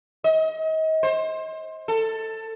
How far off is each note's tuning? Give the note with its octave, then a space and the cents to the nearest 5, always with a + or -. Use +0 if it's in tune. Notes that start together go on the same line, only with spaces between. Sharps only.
D#5 +35
C5 +15
A4 +15